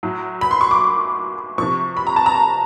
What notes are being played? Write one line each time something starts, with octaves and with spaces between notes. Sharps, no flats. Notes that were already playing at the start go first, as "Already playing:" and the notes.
A2 F#3
B5
C6
C#6
D6
C3 F3 C#6
B5
A#5
A5
A#5
A5